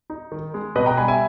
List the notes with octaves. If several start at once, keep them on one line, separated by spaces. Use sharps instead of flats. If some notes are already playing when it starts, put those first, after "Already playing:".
D#4
D#3
G#3
B2 B4 D#5
G5 A#5
G3 G#5 B5
E5 G#5